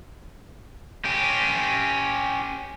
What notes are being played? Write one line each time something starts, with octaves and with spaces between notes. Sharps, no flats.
C#4 G4